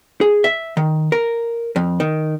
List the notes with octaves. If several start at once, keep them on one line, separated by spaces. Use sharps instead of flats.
G#4
E5
D#3
A#4
F2
D#3